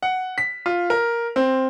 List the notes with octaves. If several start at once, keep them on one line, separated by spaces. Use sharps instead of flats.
F#5
B6
F4
A#4
C4